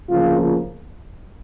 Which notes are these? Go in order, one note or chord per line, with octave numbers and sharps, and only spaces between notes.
D2 C#3 F3 A#3 F4